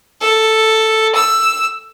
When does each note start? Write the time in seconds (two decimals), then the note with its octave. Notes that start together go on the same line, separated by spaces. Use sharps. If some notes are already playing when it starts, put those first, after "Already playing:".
0.21 A4
1.15 E6